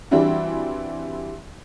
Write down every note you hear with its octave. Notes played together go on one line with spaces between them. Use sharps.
E3 G3 C4 D4 E4 F#4